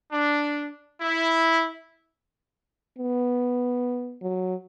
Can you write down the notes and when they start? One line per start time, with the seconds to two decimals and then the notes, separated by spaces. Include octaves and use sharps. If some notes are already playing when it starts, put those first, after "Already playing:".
0.12 D4
1.01 E4
2.98 B3
4.22 F#3